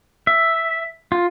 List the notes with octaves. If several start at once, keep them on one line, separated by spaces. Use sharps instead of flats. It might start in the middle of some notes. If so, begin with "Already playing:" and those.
E5
F4